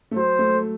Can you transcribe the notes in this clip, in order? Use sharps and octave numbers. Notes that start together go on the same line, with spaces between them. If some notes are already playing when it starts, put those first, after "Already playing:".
A3
F#3 C5
A3